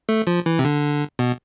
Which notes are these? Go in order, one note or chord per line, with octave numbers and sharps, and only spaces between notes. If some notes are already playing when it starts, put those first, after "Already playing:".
A3
F3
E3
C3
D3
B2